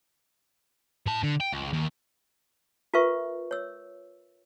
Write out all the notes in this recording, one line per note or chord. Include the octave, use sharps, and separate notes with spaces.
A2 A5
D3
G5
C#2
D#2
F4 A#4 B4 E5 C#6
C#5 E6